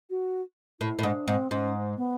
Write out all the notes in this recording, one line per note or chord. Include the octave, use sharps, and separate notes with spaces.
F#4
A2 E4
A2
G#2 D4
G#2 C4
G#2 C#4
B3